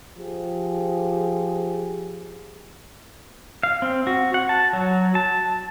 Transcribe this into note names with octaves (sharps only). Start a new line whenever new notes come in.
F3 G4 G#4
F5
C4
F#4
F#5
A5
F#3
A5